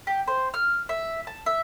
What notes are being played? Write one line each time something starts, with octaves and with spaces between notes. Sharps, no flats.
G4
C5
F6
E5
A5
E5